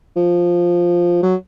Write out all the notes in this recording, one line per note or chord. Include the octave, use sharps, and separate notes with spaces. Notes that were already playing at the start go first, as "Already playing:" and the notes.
F3
F#3